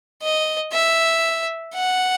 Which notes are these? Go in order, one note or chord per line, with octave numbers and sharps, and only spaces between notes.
D#5
E5
F#5